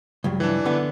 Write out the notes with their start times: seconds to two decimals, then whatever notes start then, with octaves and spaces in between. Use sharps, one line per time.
0.24 C#2 G2 F#3
0.40 E3 D4
0.65 D3 B3 B4